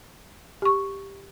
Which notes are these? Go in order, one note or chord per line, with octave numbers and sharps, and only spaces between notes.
G4 C#6